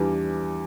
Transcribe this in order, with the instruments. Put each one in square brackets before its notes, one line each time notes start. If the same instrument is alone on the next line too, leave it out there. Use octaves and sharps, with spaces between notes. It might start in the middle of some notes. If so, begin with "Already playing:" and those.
Already playing: [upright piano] E2 E3 G3 D4